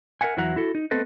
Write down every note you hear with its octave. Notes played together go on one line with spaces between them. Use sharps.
A#4 C5 E5 F#5 G#5
E2 E3 F#3 E5 F#5 A#5
E4 F#4 A4
D#4
A3 B3 C4 A4 B4 D#5